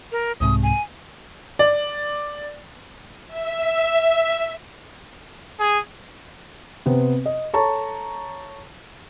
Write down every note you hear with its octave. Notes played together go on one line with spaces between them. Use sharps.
A#4
C2 G#2 C3 D#6
G#5
D5
E5
G#4
C3 B3 C4
D#5
A4 C#5 A5 A#5 C#6